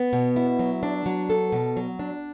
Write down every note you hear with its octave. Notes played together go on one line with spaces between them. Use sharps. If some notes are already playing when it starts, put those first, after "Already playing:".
Already playing: B3
B2
E4
F#3
D4
F#3
A4
B2
F#3
D4